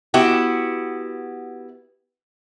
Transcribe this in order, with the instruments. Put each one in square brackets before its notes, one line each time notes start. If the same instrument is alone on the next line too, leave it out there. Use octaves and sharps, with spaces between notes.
[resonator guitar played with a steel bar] B3 E4 F#4 G4